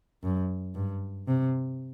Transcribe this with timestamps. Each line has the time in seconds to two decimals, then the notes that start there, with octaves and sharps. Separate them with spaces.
0.23 F#2
0.75 G2
1.27 C3